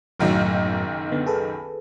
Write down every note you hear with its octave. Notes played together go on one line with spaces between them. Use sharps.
F#1 B1 F#2 A2 D#3 F#3
D3 B3
G#4 A4 B4